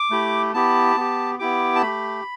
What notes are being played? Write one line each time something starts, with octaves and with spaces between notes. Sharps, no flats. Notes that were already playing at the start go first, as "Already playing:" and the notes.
Already playing: D6
A3 E4 G4
B3 E4 G4 A5
B3 G4
B3 E4 G4 D6
A5
A3 G4 B5